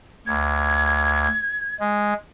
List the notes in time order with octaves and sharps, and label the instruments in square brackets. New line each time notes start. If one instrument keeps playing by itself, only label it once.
[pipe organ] D2 [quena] G#6
[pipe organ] G#3